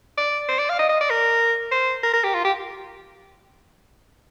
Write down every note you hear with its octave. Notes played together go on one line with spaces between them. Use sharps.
D5
C5
D5
F5
D#5
D#5
D5
A#4
C5
A#4
A#4
G4
F4
G4